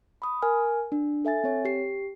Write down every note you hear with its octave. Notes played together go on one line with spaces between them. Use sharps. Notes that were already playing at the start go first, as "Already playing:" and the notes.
B5 D#6
A#4 G#5 F6
D4
A4 E5 G#5 A6
C4 C#5
G4 C7